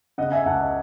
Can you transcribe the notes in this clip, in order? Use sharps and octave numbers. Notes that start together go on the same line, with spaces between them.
C#3 D#5 F#5
E5 G#5
C#2 F#5 A5
D#5